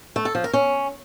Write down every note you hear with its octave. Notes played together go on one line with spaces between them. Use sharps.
A3
A4
F3
A#4
C#4